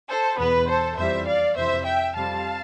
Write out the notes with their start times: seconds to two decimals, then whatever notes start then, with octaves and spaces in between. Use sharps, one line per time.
0.09 A4 C5
0.38 E2 B2 B3 B4
0.68 A4 C5
0.97 F2 E3 G3 C5 E5
1.27 D5 F5
1.56 F2 C3 E3 C5 E5
1.85 E5 G5
2.15 F2 C3 G3 C4 F5 A5